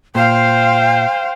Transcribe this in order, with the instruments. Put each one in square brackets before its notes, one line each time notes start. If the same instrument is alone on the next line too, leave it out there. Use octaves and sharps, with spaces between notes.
[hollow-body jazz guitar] A#2 [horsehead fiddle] C5 F5 [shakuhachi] G5